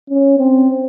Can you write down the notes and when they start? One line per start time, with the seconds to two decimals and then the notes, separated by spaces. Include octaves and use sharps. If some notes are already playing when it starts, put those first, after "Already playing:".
0.10 C#4
0.38 C4